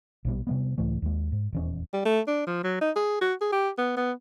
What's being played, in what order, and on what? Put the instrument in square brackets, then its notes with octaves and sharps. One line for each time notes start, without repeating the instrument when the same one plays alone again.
[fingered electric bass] A#1 B2 G3
C3 G3 B3
C#2 A2 E3 A3
D#2 G#3
G#2
D#1 E2 C#4
[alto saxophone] G3
A3
D4
F3
F#3
D#4
G#4
F#4
G#4
G4
B3
B3